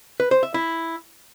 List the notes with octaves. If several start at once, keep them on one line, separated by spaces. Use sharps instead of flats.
B4
C5
E5
E4